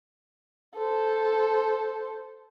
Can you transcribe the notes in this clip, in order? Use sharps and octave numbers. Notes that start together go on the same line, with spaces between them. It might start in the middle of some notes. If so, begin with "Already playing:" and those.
A4 C5